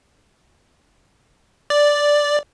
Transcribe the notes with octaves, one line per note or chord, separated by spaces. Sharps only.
D5